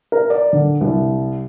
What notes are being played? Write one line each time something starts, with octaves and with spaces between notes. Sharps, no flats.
A#4
D5
D3
C2